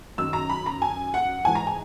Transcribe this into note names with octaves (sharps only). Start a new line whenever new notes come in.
F#2 D#3 E6
A#5
B5
A#5
G#5
F#5
G#2 E3 G#5
A#5
G#5